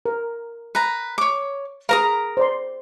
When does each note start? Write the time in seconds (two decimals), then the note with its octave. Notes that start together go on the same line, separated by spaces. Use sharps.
0.05 A#4
0.75 B4 A#5
1.18 C#5 D6
1.89 G#4 A#4 B4 F5 A#5 D#6
2.37 C5 D5 C6